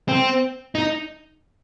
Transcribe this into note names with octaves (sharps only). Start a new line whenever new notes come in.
C4
D#4